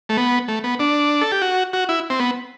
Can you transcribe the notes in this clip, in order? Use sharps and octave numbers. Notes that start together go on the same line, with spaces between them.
A3
B3
A3
B3
D4
A4
G4
F#4
F#4
E4
C4
B3